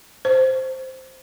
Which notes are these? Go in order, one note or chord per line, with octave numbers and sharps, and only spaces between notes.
C5